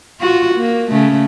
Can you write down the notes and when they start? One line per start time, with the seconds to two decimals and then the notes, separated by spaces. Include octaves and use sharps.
0.20 F4 F#4
0.55 A#3
0.91 C#3 A3